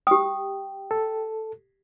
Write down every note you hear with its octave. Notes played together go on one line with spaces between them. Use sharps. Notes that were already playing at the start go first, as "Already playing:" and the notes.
G4 G5 D#6
A4